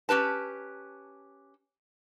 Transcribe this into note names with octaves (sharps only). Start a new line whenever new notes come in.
C#4 G4 B4 A5